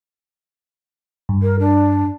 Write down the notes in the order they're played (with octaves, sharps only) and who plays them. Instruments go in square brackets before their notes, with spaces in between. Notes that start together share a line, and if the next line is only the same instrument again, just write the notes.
[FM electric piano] G2
[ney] A#4
D4